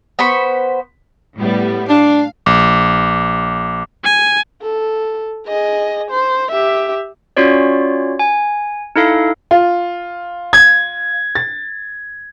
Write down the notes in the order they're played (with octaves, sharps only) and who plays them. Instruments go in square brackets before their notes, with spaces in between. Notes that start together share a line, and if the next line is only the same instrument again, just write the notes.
[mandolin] B3 C5 B5 C#6
[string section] A2 G3 B3
[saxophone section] D4 [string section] F5
[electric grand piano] A#1 [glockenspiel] D6
[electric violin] G#5
[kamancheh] A4
G#4 D#5
C5
G4 E5
[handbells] C#4 F4 F#4 C#5 D5
G#5
D#4 E4 A4 F5
[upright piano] F4
[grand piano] G#6
[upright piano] A6